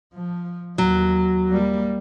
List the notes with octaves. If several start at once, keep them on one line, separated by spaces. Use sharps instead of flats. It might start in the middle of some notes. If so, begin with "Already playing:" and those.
F3
D#2 F#3
G3 A#3